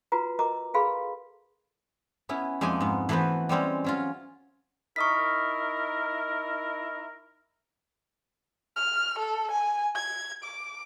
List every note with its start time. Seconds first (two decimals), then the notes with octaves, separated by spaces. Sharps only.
0.12 F4 F#4 B4 A#5
0.39 A#4 D#5 A#5 D6
0.74 G#4 A4 B4 F5 B5 C6
2.29 B3 C#4 E4
2.61 F2 G#3 A#3 D#4 G#5
2.80 G#2 B3
3.09 E3 A3 B3 F#4 B4 C5
3.49 G3 G#3 C4 C#4
3.84 F#3 C#4 F4
4.96 D#4 E4 A#4 C#6 D#6 B6
8.77 F6
9.19 A4
9.52 G#5
9.95 G#6
10.44 D6